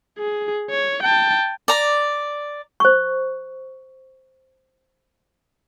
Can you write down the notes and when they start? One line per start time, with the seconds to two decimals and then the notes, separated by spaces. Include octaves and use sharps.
0.18 G#4
0.70 C#5
1.02 G5 A5
1.68 D5 A#5
2.80 C5 C#6